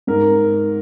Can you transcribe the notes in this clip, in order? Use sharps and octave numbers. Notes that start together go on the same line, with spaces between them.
G#2 A#4